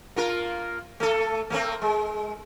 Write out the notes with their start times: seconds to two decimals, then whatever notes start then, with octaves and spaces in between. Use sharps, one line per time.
0.16 A#3 F4 A#4
1.00 A3 A4
1.50 A3 A#3 C4
1.82 G#3